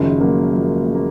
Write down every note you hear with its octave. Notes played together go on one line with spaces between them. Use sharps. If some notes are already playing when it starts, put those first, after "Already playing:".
Already playing: F#1 F#2 D#3 F3 G#3
F#3 A#3
F3 G#3
G#3
A#3